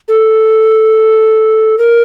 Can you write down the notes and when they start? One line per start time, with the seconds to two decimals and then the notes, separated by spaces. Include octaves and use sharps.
0.08 A4
1.78 A#4